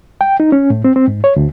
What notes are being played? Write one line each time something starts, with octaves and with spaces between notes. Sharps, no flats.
G5
D#4
C#4
A2
C4
C4
G#2
C#5
D2